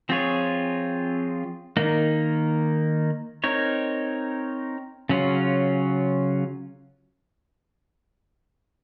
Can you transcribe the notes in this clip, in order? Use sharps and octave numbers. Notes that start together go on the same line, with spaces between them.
F3 C4 F4 G#4 C#5
D#3 A#3 D#4
C4 D#4 A#4 C#5
C#3 F#3 C#4 F4